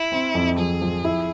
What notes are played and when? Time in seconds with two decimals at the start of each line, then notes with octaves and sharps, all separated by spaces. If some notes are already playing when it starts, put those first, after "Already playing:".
Already playing: E4
0.12 C4
0.35 F2
0.58 F3 G#4
0.81 F3
1.04 E4